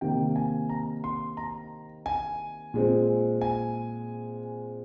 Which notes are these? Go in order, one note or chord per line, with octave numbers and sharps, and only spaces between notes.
C3 D#3 A#3 G5
G#5
A#5
C6
A#5
G#5
A#2 G#3 C4
G#5